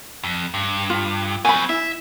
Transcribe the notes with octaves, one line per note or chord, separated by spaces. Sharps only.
F2
G2
F4
F#3 C4 G#5 B5
E4 E5